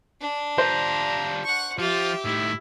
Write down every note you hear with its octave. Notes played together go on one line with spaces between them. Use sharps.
D4
G3 F4 C5 A#5
F#5 C#6
F3 F4 G4 E5
A2 D#3 E4